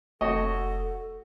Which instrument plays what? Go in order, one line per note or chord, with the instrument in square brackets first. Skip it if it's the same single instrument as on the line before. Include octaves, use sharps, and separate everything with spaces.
[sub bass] F1 [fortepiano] A3 C#5 D#5 [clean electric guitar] F#4 [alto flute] A4